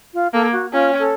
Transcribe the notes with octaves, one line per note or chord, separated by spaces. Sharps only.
F4
A#3 A4
F#4
C#4 F4
A4